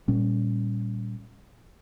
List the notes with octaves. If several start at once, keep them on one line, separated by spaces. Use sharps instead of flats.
A#2 G3 C#4